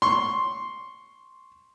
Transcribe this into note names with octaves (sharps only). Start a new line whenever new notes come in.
C6 C#6